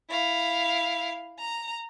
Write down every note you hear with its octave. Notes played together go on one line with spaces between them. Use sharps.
E4 F5
A#5